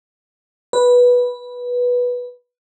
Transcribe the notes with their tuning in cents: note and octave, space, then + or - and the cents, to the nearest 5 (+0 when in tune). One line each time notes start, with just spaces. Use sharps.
B4 -10